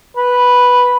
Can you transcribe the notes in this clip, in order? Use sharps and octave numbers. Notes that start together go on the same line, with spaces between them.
B4